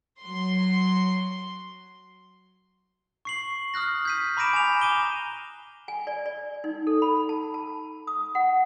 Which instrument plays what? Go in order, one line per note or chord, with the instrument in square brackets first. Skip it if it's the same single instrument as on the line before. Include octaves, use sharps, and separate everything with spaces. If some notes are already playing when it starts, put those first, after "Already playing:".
[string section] F#3 C6
[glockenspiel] C#6 C7 F#7
D#6 F6 F#6 A#6
G6 B6 D#7
A#5 B5 D6 A#6 D7 E7
G#5 E7 F7
G#5 D6 D#7 G7
[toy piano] G#5
D5
D5
D#4
A4
B5
A5
A5
D#6
F#5